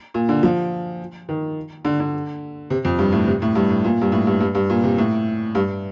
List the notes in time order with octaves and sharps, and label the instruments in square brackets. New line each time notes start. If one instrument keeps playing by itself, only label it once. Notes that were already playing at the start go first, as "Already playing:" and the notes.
[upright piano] A#2
D3
F3
D#3
D3
D3
C3
F2
G2
A2
C3
A2
G2
A2
A#2
G2
A2
G2
G2
G2
A#2
C3
A2
G2